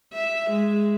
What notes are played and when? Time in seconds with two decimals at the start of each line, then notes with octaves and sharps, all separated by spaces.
0.13 E5
0.51 G#3